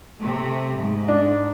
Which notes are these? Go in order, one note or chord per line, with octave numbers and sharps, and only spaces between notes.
C3 A3
G#2
D4